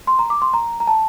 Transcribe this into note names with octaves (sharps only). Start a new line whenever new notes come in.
C6
A#5
D6
C6
A#5
A#5
A5